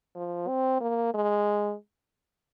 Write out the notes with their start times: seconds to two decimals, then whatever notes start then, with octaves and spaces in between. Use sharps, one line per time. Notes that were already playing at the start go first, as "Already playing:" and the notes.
0.15 F3
0.48 C4
0.81 A#3
1.14 G#3